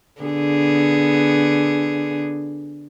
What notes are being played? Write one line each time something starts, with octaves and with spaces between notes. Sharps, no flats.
D3 B3 G#4